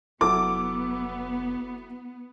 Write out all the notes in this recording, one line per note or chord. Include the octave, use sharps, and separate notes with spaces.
F1 F#3 B3 E4 A4 D6